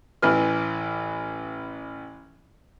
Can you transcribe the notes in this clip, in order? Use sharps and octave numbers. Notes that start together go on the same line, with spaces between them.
A1 E3 B4 F6